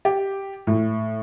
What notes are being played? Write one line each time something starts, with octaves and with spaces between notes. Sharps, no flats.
G4
A2